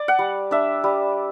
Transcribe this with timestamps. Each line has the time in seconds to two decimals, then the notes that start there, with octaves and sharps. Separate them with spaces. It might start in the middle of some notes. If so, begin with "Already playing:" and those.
Already playing: D5
0.08 F#5
0.19 G3
0.51 D4 E5
0.84 G3